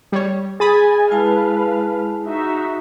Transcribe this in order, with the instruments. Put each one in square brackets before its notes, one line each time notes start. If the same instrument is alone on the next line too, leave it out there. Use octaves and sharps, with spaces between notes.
[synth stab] G3 C#5
[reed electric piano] G#4 [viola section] D#5 G#5 [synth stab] B5 D#6 A6
[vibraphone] G#3 E4 A5 [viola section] B4 F5
[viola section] D#4 F#4 E5